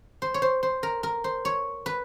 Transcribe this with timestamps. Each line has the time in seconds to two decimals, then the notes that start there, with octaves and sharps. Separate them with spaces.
0.22 C5
0.34 C#5
0.42 C5
0.63 C5
0.83 A#4
1.03 A#4
1.24 C5
1.45 C#5
1.86 B4